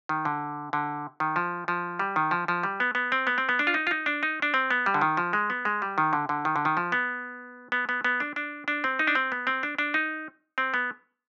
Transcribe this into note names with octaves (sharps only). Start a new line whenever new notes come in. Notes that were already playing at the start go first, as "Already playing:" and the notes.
D#3
D3
D3
D#3
F3
F3
G3
D#3
F3
F3
G3
B3
B3
C4
B3
C4
B3
D4
F4
D#4
F4
D#4
D4
D#4
D4
C4
B3
G3
D3
D#3
F3
G#3
B3
G#3
G3
D#3
D3
D3
D#3
D3
D#3
F3
B3
B3
B3
B3
D4
D4
D4
C4
D#4
D4
C4
B3
C4
D4
D4
D#4
C4
B3